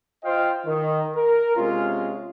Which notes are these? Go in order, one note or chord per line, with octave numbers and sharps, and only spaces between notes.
F4 C5 D#5 F5 G5
D#3
A#4
C3 G#3 C#4 F4